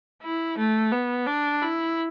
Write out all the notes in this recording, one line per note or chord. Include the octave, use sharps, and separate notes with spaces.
E4
A3
B3
D4
E4